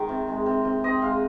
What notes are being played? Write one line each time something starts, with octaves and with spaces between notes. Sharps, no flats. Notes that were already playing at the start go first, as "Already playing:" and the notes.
Already playing: D#3 G#3
C3
G#3
C3
C3
C4 D#5
G#3 F5